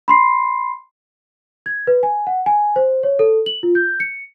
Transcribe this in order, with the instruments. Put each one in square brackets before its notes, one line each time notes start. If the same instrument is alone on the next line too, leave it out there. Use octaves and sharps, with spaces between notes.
[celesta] B5 C6 C7
G#6
B4
G#5
F#5
G#5
C5
C#5
A4
F#7
F4
G6
C#7